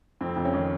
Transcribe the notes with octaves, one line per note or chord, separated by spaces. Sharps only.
F2 C4
F2
C#4
D#3